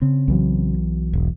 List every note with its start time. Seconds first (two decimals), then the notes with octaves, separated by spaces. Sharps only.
0.01 C#3 C4
0.28 B1 E3 F#3
1.13 E1